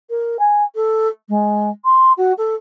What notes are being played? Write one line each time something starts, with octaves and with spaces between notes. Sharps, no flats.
A#4
G#5
A4
G#3
C6
F#4
A4